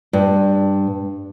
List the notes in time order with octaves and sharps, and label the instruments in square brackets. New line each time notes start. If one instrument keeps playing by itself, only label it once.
[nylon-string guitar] G2